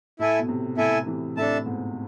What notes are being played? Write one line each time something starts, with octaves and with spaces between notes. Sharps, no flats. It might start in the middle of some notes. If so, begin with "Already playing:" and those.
A2 E4 A4 E5 G#5
B2
A2 C3
A2 C3 E4 A4 E5 G#5
C3 E3
A2 C3 D4 A4 E5 A5
G#2 B2